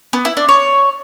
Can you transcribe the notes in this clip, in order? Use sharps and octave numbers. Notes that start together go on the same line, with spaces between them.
B3
E4
D4
C#5